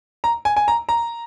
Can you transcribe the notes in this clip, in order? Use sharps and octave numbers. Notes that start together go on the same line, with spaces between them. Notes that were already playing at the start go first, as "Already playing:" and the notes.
A#5
G#5
G#5
A#5
A#5